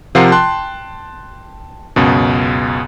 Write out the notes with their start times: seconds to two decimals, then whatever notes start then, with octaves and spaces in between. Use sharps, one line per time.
0.15 C3 F3 F4 A#4 F#5 C7
0.32 G5 A5 C6 F#6
1.96 C#2 F#2 B2